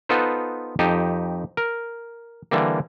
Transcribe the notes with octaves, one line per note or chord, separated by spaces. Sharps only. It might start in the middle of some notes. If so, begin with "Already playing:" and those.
B3 D#4 F4 A4 B4 C5
F2 D#4 G4 A5
A#4
D3 E3 G3 A#3